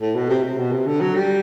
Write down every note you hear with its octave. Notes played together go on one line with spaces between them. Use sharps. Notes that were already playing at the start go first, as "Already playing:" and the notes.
A2
B2
C3
C3
B2
C3
D3
F#3
G3